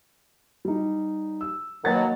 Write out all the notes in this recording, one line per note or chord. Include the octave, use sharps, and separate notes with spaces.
G3 D#4
E6
B2 D#3 F#3 A#3 F#5 A6